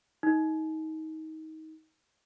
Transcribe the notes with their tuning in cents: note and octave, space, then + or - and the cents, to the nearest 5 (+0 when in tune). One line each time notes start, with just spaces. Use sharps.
D#4 +25